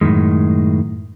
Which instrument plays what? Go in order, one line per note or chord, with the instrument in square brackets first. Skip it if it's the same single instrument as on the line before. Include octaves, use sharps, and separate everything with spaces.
[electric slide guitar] F#2 A2 C3 D#3 G#3